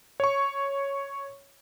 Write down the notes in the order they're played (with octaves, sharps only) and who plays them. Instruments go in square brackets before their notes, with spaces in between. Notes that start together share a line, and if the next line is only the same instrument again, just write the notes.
[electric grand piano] C#5 C#6